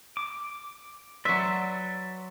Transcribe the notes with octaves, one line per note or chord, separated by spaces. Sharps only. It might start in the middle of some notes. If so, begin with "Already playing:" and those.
D6
F#3 B4 D5 E5 C6